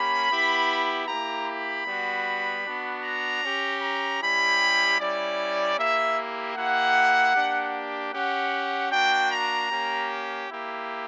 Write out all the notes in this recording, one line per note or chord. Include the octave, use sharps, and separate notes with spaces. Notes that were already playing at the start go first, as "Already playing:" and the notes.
Already playing: A#3 C#4 G4 B5
B3 E4 G4
A#3 E4 G4 A#5
B5
G3 B3 F#4
B3 D4 F#4
A#5
C#4 G4
A#5
G3 C#4 E4 G4 B5
G3 C#4 E4 D5
A#3 E4 G4 E5
A#3 E4 G4 F#5
A#3 D4 G4
C#4 G4 F#5
A#3 D4 F#4 G5
A#5
A#3 C#4 G4
A#3 E4 G4